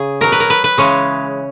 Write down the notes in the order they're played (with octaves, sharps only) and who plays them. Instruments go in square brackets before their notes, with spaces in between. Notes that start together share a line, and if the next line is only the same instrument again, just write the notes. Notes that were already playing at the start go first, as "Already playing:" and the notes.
Already playing: [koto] C#3 G#4
B2 F#3 A#4
B4
A#4
B4
B4
C#3 E3 G#3 C#4